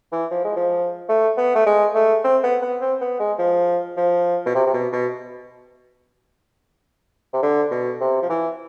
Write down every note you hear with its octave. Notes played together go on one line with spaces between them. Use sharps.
E3
F3
G#3
F3
A3
B3
A3
G#3
A3
C4
B3
B3
C4
B3
G#3
F3
F3
B2
C3
C3
B2
B2
C3
D3
B2
C3
F3
E3